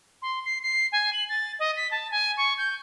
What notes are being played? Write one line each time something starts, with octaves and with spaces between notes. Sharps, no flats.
C6
C7
C7
G#5
F#7
A6
D#5
B6
A5
G#5
C#6
G6